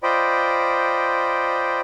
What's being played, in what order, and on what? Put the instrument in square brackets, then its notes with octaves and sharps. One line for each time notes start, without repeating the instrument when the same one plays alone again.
[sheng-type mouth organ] F4 C5 D5 D#5 G5 B5